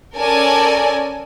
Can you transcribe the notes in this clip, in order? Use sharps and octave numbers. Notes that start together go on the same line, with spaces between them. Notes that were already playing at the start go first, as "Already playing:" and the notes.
C#4 A4 A#4 D5 G#5 A5